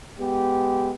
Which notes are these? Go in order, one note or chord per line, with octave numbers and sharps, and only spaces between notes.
G#3 B3 G4